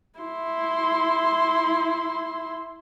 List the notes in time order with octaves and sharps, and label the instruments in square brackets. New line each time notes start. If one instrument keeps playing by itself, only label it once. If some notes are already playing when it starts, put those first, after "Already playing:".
[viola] E4 C6